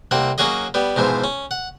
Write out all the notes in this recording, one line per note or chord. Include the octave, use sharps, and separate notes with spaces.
C2 A#3 C4 F#5
F#3 A#3 C#4 F#4 G#4 D#5
G3 B3
G#2 B2 E3 F3
C#4
F#5